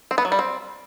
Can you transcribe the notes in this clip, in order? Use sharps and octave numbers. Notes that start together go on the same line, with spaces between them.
C4
B3
F#3
G3
C4